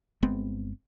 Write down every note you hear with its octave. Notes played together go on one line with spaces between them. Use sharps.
G1 G#3 B3 C4